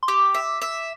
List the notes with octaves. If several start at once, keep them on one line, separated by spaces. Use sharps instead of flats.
C6
G4 D6
E5
E5